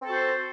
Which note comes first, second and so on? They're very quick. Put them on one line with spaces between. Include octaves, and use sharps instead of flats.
C4 A4 F#4 C5